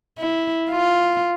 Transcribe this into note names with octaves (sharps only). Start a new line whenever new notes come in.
E4
F4